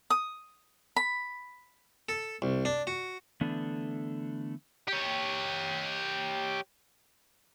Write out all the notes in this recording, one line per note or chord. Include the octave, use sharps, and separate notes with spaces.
D#6
B5
A4
C2
D4
F#4
D3 E3 A3 B3 D4
G4 C#5